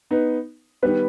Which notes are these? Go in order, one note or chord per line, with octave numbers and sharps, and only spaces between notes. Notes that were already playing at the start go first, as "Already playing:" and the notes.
B3 D#4 B4
D#3 G3 B3 B4